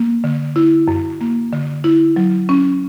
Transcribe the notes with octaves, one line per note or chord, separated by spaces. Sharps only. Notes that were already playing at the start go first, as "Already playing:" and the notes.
Already playing: A#3
D3
E4
F#2
A#3
D3
E4
F#3
C#4